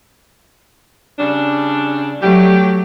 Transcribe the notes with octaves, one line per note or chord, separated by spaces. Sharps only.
C#3 G3 D4
F#3 A3 G4